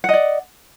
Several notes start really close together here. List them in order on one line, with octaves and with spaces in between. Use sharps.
F#5 D#5 D5